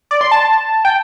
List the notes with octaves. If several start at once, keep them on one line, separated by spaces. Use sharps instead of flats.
D5
C6
A5
G5